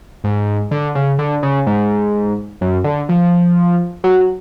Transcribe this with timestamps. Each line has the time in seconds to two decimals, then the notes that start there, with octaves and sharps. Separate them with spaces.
0.24 G#2
0.71 D3
0.95 C#3
1.19 D3
1.43 C#3
1.67 G#2
2.61 F#2
2.84 D3
3.09 F3
4.04 F#3